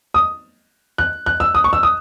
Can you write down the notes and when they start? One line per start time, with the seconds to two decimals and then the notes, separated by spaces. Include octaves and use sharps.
0.14 D#6
0.98 F#6
1.26 F#6
1.40 E6
1.55 D#6
1.64 C#6
1.73 E6
1.83 D#6